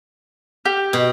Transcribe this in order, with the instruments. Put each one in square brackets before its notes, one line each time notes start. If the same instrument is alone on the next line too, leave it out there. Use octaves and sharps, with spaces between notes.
[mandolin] G4
[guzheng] B2